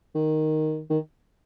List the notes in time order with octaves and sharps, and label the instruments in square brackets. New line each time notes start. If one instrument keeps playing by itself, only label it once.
[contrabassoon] D#3
D#3